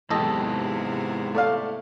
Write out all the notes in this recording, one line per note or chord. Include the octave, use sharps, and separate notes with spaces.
E2 G#2 C3 B3 E4 G4 A4 D#5
A3 D5 F5